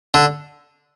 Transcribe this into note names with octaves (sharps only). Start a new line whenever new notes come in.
D3